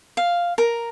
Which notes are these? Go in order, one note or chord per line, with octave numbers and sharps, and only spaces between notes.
F5
A#4